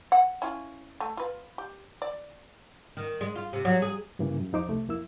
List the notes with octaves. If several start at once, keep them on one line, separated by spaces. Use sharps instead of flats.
F#5
C#4 E4 F4
A3
F4 B4
G4
D5
D#3
G#3
F4
C3
F#3
G#4
G2 C#3 E3 A#3
F#2
E2 F3 D#4 C5 D6
C2 C3 A3
F2 A#3 E4 E6